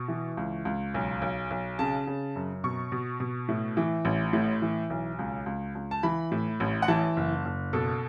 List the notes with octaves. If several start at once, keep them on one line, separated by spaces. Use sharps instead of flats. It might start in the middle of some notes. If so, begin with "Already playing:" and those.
Already playing: B2 C#6
E3
C#2
C#2
B1
B1
B1
C#3 A5
C#3
F#2
B2 C#6
B2
B2
A2
E3
A1
A2
E3
B1
C#2
C#2
C#2
A5
E3 B5
A2
A1
F#5
E3 A5
F#1
F#1
B2 A4